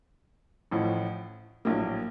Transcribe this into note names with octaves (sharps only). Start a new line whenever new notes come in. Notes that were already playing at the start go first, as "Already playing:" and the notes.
A1 A2 F3
A#1 A2 F#3 A#3